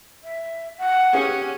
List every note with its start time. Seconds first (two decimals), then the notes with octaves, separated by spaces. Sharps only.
0.23 E5
0.78 F#5
1.13 C#4 G4 G#4